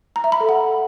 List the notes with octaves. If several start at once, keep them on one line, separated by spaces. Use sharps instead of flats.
A#5
E5
B5
A4
F#5